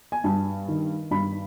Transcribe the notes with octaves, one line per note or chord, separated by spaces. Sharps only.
G#5
G2 A5
D#3
G2 B5